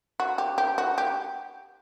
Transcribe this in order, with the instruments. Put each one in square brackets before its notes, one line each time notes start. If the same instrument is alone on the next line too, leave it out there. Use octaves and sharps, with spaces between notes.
[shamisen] F#4
G4
G4
F#4
G4